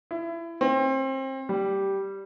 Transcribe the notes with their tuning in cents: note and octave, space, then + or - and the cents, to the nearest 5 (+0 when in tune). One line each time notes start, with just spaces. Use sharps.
E4 +25
C4 +30
G3 -5